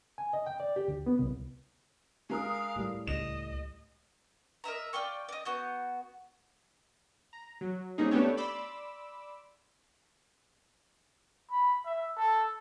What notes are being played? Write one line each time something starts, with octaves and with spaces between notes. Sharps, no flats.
G#5
D#5
G5
D5
G4
D2
B3
C2
G#3 A#4 F5 D#6
A2 G3
C#2 D#5 E7
A#4 D#5 E5 A#5
F4 D5 G5 C#6
D5 D#5
B3 F#4 G6
A#5
F#3
G3 A#3 C4 C#4 D#4 G#4
A3 B3 D4 G4 A4 C#5
D5 B5 C6 D6 E6
B5
E5
A4